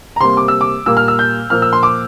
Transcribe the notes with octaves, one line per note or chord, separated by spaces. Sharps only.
A#5
C3 G3 A#3 C6
D6
E6
D6
A#2 G3 A#3 E6
F6
E6
G6
A#2 F3 A#3 F6
E6
C6
D6